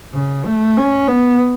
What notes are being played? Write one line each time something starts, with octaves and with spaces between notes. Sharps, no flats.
C#3
A3
C#4
B3